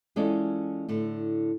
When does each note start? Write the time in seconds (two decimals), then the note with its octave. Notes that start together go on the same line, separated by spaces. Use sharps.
0.16 E3 G#3 C#4 F4 A4 D5
0.89 A2 D3